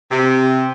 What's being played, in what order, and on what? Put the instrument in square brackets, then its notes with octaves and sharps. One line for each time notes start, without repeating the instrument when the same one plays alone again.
[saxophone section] C3